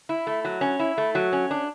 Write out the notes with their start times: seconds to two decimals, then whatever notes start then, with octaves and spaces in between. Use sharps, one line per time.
0.09 E4
0.27 A3
0.45 F#3
0.61 C#4
0.80 E4
0.98 A3
1.15 F#3
1.33 C#4
1.51 D4